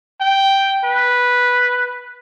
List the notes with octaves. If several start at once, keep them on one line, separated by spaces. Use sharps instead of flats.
G5
B4